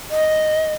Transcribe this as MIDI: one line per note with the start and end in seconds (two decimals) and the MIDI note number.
0.10 0.74 75